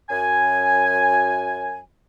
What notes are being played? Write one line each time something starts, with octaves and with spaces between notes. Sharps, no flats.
F#2 G#5